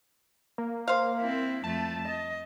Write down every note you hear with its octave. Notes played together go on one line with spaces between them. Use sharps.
A#3
C5 F5
C4 E4
F2 A3 A5
D#5